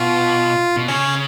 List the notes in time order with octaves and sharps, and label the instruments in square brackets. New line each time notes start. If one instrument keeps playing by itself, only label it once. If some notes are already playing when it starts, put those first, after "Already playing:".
Already playing: [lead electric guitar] B2 [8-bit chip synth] F4
[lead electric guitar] B2
[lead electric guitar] C#3 [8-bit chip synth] C#4